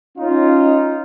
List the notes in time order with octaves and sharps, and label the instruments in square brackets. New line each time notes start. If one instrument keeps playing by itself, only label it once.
[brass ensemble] C#4 D#4 F4